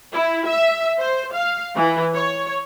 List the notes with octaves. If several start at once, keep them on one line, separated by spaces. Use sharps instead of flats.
E4
E5
C5
F5
E3
C#5